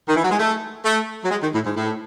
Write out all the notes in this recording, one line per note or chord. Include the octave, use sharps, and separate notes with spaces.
D#3
E3
F#3
G#3
A3
A3
F#3
G#3
D#3
A2
G#2
A2